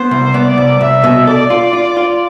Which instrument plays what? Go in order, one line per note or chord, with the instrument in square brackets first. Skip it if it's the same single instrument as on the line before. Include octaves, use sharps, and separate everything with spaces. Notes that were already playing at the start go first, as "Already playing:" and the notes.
Already playing: [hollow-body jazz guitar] B3 [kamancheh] C5
[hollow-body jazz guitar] C2
[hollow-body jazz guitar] B3 [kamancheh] D5
[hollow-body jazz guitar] C2
[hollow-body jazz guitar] C2 [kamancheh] E5
[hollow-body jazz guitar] B2
[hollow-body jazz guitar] A4 [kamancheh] D5
[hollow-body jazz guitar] F4
F4
F4